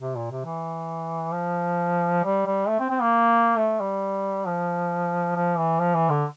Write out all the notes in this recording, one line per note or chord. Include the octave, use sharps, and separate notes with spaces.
C3
A#2
C3
E3
F3
G3
G3
A3
C4
C4
A#3
A3
G3
F3
F3
E3
F3
E3
D3